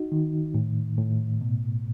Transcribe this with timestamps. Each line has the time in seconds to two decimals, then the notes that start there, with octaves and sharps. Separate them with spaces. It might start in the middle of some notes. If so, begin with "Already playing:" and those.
Already playing: D#4 F#4
0.12 D#3
0.54 A2
0.98 A2
1.41 B2